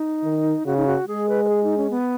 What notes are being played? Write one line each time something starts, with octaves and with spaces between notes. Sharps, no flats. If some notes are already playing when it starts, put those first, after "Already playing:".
Already playing: D#4
D#3
C#3 F#4
D#4
F#4
G#3 G#4
B4
B4
G#4
D#4
C#4
B3